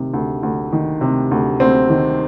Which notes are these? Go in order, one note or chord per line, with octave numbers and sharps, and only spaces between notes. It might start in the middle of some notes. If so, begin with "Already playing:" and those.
Already playing: C3 D#3
D2
D2
D#3
C3
D2
D2 C4
D#3